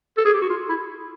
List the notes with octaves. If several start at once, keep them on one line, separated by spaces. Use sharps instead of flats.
A4
G#4
G4
F#4
F4
E4